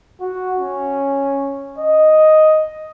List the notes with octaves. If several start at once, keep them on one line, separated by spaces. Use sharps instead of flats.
F#4
C#4
D#5